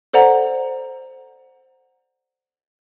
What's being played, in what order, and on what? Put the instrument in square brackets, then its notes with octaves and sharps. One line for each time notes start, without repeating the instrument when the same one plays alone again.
[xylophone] A4 C5 D5 F#5 A#5